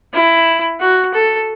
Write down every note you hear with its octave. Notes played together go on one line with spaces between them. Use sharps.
E4
F#4
A4